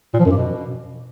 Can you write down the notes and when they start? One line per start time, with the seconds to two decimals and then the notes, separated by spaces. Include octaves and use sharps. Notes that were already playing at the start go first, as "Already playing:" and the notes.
0.14 A#2
0.19 F3
0.25 F#2
0.31 G2
0.37 B2